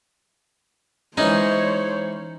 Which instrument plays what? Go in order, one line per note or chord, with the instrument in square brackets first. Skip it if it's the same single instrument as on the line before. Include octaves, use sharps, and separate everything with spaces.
[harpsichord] E3 G#3 C#4 [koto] D#4 [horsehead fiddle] C5 C#5